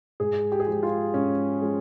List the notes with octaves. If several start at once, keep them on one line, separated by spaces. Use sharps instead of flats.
G#2 G#4
G4
G#4
F3 G#3 G4
F4
G#2 C#4
F3 G#3